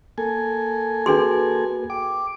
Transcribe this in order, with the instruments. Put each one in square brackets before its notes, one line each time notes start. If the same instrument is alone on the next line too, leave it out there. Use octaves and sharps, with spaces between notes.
[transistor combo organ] A#3 A4 G#5
[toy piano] D4 G#4 C6 [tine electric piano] F#4 B4
[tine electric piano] G5 [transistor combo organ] D6